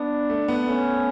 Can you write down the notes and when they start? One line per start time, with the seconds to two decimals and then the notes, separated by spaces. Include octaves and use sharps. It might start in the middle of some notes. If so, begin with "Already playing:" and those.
Already playing: B3 D4
0.30 A3
0.48 B3
0.67 A3 C#4